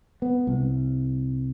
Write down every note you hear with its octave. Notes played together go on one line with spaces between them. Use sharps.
B3
C2